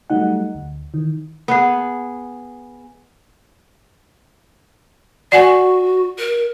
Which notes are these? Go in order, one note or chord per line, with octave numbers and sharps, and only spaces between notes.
F#3 G3 A3 D#4 F#5
D2
D#3 E3
B3 G#4
F#4 D5 F#5 G#5
A#4